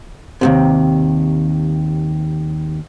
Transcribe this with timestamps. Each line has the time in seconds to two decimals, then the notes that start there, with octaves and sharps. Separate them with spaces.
0.41 D#2 A2 C3